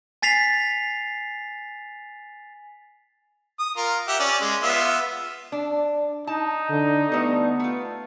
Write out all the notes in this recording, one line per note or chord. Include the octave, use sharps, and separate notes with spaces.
G#5 A6 B6 C7 F7
D#6
F4 A#4
G4 E5 F#5
C#4 D5
G#3
B3 F4 E5
D4
D#4 A5
D3
G3 A3 B3
A3 F4